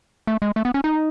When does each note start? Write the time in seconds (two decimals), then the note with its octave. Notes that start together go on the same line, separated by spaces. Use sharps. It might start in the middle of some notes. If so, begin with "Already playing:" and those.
0.27 A3
0.42 G#3
0.56 A3
0.65 B3
0.74 C#4
0.84 D#4